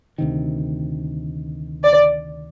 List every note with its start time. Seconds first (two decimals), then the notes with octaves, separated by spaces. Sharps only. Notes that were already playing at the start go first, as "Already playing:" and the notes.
0.18 D2 C3 D#3
1.84 D5